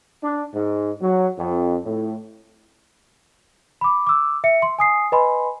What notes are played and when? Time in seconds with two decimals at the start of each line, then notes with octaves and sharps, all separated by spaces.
0.23 D4
0.54 G#2
1.02 F#3
1.39 F2
1.85 A2
3.81 B5 D6
4.07 D6 E6
4.44 E5 C#7
4.62 C6
4.79 G#5 D#6 C7
5.12 B4 D#5 G#5 B5 C6